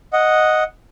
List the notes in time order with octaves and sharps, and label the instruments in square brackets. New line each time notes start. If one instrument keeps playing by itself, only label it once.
[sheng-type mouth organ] D#5 F#5